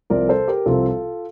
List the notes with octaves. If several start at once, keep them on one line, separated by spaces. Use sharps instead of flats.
C2 C3 F3 C4 A#4 D5
A4 C5
G4 A#4
C2 C3 F3 C4 F4 A4